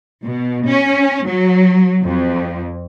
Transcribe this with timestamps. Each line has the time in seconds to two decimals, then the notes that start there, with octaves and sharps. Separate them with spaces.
0.24 B2
0.67 C#4
1.26 F#3
2.03 F2